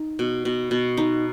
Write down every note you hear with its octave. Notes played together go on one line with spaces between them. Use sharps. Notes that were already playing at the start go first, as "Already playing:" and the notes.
Already playing: D#4
B2
B2
B2
D#4